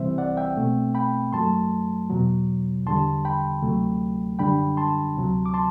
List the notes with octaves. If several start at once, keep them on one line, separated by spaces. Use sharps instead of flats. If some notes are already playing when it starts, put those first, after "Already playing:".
Already playing: C2 C3 E3 G3 C4 C5 E5
D5 F#5
E5 G5
B2 A3 C4
G5 B5
F#2 F#3 A3 A5 C6
E2 B2 F#3
E2 D3 G3 A5 C6
G5 B5
D2 C3 F#3 A3
F#2 D3 G3 D4 G5 B5
A5 C6
D2 C3 F#3
D6
A5 C6